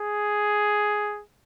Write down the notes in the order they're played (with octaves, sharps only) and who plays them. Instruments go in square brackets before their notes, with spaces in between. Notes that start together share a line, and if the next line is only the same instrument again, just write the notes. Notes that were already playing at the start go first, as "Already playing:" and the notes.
Already playing: [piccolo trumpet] G#4